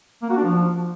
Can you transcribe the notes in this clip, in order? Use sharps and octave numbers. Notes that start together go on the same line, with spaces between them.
A#3
F#4
D4
F3